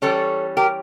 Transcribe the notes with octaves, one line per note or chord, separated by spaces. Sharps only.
E3 G3 C#4 A4 C#5
G4 A#4